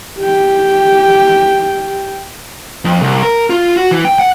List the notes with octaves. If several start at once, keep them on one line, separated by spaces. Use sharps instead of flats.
G4 G5
F2
C2
A#4
F4
F#4
E3
G5
F#5